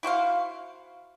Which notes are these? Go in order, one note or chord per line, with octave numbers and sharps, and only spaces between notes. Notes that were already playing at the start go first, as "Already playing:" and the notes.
E4 F#4 C5 F5